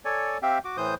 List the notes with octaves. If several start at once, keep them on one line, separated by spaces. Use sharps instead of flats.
A4 C#5 D5 G#5
C4 G4 E5 F5 G5
F#4 D6
A2 E3 C5 D#6 G6